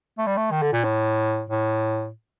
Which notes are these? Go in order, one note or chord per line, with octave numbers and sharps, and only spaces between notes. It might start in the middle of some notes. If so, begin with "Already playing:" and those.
A3
G3
A3
D#3
D3
A#2
A2
A2